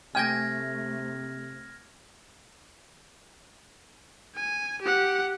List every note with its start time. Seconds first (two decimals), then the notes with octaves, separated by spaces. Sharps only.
0.15 C3 A3 G5 G#5 F6 G#6 A#6
4.35 G#5
4.82 G4 F#5